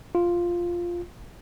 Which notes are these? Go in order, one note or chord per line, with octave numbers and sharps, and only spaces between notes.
F4